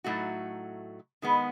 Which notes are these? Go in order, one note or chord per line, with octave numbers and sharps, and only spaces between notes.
A2 F#3 A3 D#4 F#4
D#3 G#3 B3